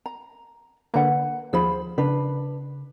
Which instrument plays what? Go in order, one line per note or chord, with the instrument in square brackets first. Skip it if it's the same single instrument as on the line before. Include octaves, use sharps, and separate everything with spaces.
[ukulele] A#5
[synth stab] D3 A#3 [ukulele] B4 F#5
[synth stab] D#2 F3 [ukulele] G#4 C5 B5
[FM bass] C#3 [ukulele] D4 B4